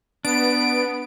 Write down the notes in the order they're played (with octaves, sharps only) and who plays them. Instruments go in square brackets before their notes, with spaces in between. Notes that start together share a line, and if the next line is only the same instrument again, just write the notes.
[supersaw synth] B3 [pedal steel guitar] D4 [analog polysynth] D7